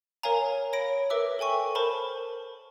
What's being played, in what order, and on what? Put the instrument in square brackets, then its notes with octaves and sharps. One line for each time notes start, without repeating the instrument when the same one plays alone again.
[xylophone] A#4 C#5 F5 G#5 A#5
C#5 B5 A#6 D7
A#4 B4 E5 D6 E6
A4 G5 G#5 C#6
A#4 C5 A5 B5